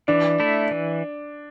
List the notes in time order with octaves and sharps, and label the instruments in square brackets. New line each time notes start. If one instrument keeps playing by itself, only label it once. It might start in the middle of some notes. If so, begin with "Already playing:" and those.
[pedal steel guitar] E3 [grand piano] D4
[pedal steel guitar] A3 E4
E3